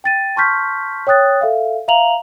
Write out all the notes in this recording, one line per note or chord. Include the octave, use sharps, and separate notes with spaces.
G5 A6 D#7
A5 C6 C#6 F6 G6 B6
C#5 G5 D#6 F#6 A6
A4 E5 F5
E5 F5 A#5 F7 F#7